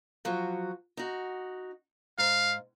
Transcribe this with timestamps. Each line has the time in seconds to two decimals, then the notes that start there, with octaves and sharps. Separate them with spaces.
0.25 F3 F#3 F#4
0.97 D#4 F#4
2.18 G#2 F5